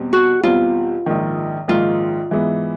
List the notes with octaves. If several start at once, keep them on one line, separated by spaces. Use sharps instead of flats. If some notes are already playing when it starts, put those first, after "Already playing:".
Already playing: E2 B2 G3 C4
F#4
E2 B2 G3 C4 F4
A#1 G#2 D#3
A#1 G#2 D#3 F4
G#2 E3 G#3 B3 E4